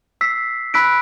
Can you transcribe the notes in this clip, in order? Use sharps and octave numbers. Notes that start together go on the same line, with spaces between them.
E6 B6 C7
B5 E6 F#6 B6 D7